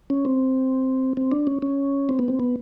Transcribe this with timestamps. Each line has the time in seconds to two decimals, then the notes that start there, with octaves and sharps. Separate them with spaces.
0.10 C#4
0.25 C4
1.17 C4
1.31 D4
1.47 C#4
1.62 C#4
2.09 C4
2.19 B3
2.28 C4
2.39 B3